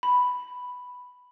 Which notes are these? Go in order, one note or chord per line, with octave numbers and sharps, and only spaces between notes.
B5